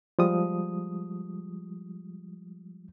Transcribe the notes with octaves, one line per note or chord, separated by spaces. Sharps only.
F3 G3 G#3 D#6